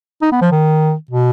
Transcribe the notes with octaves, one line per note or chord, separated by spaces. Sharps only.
D#4
B3
F3
D#3
B2